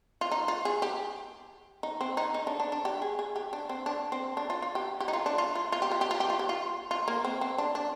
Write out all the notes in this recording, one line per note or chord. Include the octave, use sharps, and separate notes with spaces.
F4
D#4
F4
G#4
G4
D#4
C4
D#4
D#4
D4
D4
D4
G4
G#4
G#4
G4
D4
C4
D4
C4
D4
F4
F4
G4
G4
D#4
F4
D4
F4
F4
F4
G4
F4
G4
F4
G4
F4
G4
F4
F4
A#3
C4
C4
D4
D4